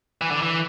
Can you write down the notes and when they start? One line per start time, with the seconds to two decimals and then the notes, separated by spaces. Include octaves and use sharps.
0.21 E3
0.31 D3
0.42 E3